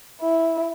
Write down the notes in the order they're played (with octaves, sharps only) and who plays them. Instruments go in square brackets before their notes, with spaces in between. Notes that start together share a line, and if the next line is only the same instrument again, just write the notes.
[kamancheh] E4